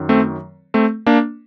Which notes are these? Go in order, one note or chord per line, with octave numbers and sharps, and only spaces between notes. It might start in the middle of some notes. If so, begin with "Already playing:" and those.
Already playing: F#2 D#3 F#3
A3 C4
A3 C4
A#3 D4